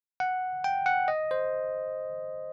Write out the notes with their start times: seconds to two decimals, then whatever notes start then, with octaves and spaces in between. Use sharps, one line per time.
0.20 F#5
0.64 G5
0.86 F#5
1.08 D#5
1.31 C5